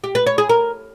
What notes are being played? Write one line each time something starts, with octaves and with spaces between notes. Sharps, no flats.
G4
B4
C#5
G#4
A#4